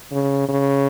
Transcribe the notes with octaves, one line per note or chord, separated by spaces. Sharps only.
C#3
C#3